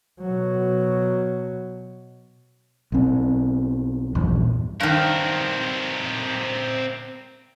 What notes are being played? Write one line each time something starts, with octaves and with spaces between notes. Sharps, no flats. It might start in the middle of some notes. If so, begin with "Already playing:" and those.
B2 F#3
B1 C4
A#1 E2 G2
G2 D#3 C4 A#4